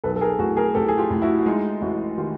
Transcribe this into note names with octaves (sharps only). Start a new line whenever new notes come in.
B1 A4 B4
A4
G#4 A#4
A2 F#4 G#4
G#4 A#4
A2 G4 A4
G#4
F4 G4
A2
E4 F#4
F#4
G#3 D#4 F4
A1 E4 F#4
D#3 F4 G4